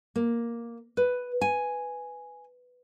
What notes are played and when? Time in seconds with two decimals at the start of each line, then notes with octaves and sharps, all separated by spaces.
0.16 A#3
0.97 B4
1.41 G#5